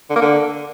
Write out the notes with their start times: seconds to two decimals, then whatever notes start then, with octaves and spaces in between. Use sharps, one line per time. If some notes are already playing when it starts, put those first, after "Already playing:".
0.10 D3
0.16 A#3
0.21 D3